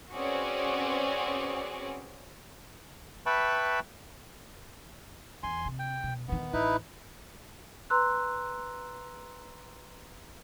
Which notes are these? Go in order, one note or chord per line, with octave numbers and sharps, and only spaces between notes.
C4 C#4 F#4 G#4 B4 D5
B4 E5 G5 A5 B5 C#6
E2 G#5 C6
C3
G5
B2
D#1 D#3 B3
A1 D#4 E4 B4
B4 A#5 C6 E6 F#6